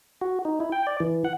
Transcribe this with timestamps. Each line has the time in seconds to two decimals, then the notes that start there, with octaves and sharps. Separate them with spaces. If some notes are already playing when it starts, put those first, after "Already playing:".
0.21 F#4
0.45 D#4
0.60 E4
0.72 G5
0.87 D5
1.00 E3
1.25 F#5